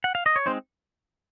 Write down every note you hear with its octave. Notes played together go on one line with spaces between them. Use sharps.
F#5
F5
D#5
C#5
G#3 C4 D#4 C5